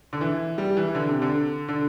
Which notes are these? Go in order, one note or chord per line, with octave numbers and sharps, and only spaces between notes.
D3
E3
G3
E3
D3
C3
D3
D3